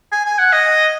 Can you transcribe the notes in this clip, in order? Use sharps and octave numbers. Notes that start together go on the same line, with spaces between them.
G#5
G#5
F#5
D#5